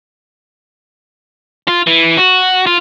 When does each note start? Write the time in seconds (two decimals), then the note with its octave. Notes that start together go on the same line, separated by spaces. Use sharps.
1.68 F4
1.87 E3
2.18 F#4
2.66 F4